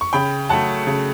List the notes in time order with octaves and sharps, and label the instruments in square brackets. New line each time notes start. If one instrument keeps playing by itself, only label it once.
[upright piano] C#6
C#3 G5 B5
F#3 A3 F#5 A5
C#3